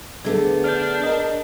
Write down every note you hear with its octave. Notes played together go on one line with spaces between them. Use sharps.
D3 A3 B3 G#4
D4 F6 G6
A#4 D#5